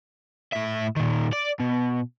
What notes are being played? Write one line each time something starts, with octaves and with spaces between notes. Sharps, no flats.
A2 E5
A#2 D#3
D5
B2